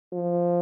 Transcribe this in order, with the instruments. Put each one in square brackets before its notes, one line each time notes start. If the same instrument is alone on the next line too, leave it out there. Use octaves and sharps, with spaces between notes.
[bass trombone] F3